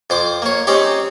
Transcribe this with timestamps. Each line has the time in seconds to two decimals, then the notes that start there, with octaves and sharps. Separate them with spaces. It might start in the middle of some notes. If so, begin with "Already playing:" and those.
0.10 F2 C5 D6
0.42 A#3 C#5
0.67 C4 C#4 D#4 G4